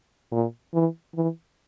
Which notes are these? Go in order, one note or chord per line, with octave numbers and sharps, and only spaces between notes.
A#2
E3
E3